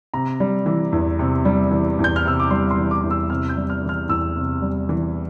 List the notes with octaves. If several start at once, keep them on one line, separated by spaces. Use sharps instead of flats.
C3 A#5
G3
E3
E2
C3
G3
E3
E2
G6
F6
C3 E6
D6
G3 C6
C6
E3
D6
E2
E6
C3 F6
G6
G3
F6
E3
F6
E2 E6
C3
G3
E3